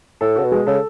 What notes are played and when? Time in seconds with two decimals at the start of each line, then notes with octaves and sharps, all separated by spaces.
0.21 A2 A4
0.36 C#3 F#4
0.44 B2
0.52 G#3
0.67 C#3 A4